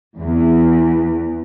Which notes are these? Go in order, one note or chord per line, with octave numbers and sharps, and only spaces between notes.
E2